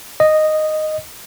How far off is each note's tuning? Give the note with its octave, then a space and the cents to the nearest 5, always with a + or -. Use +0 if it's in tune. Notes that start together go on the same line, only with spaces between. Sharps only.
D#5 -5